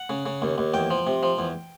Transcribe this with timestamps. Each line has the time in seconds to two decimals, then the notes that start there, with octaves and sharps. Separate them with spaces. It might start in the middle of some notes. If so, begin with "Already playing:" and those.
Already playing: F#5
0.10 C#3
0.26 C#3
0.42 D#2
0.58 D#2
0.74 E2 G5
0.90 F3
1.07 C3
1.23 F3
1.39 E2